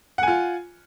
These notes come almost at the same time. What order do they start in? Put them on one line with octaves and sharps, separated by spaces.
F#5 G#5 F4